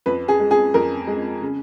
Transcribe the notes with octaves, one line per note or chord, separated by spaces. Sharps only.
F2 B4
G#4
G#3
G#4
F2 A#4
G#3
C#3